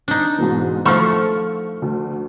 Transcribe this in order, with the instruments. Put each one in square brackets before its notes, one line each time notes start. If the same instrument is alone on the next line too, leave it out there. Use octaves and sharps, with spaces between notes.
[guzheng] D4 D#4
[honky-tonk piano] G#2 B2 E3
[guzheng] F3 A3 [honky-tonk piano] F#5 C#6 F6
[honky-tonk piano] D2